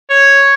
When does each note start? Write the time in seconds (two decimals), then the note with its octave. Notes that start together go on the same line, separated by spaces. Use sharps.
0.10 C#5